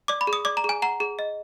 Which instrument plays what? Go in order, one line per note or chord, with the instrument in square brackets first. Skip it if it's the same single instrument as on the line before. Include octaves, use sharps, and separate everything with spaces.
[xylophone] D5 D6
B5
G#4
D#6
D5 D6
A#5
G#4 G#5
F#5 A#5
G#4
D#5